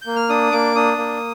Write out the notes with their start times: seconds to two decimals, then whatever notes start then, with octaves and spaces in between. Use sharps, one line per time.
0.02 A#3 G6
0.16 F6
0.29 D4 D#6
0.52 A#3 D6
0.76 D4 D#6
0.98 A#3